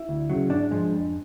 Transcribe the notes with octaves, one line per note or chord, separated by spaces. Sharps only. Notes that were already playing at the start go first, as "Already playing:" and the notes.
Already playing: E4
D2
C#3 F#3
G#2 D4
F3 G#3
F2